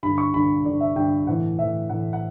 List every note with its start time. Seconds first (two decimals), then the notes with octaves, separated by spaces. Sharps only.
0.03 G2 D3 B5
0.18 C#6
0.34 G2 D3 B5
0.65 G2 D3 D5
0.81 E5
0.96 G2 D3 G5
1.27 A2 E3 F#5
1.58 A2 E3 E5
1.90 A2 E3 F#5
2.13 F#5